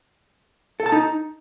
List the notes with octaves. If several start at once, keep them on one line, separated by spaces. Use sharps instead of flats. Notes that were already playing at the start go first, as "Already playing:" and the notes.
A4
A5
D#4